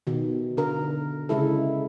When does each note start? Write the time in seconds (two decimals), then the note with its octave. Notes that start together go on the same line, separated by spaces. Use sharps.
0.07 B2 D#3
0.57 D3 A#4
1.29 C#3 G#3 E4 A4